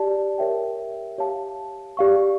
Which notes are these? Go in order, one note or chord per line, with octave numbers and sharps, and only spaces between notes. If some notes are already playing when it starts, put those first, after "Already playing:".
Already playing: G4 D5 A5
G4 A#4 C#5 E5 G5
G4 C#5 F5 A5
G4 D5 F5 C#6